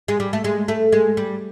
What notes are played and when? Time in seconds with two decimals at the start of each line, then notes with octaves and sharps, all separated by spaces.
0.08 G#3
0.20 G3
0.33 A3
0.44 G#3
0.68 A3
0.93 G#3
1.17 G3